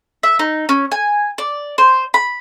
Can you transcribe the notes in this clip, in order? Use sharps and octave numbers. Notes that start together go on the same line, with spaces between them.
E5
D#4
C#4
G#5
D5
C5
B5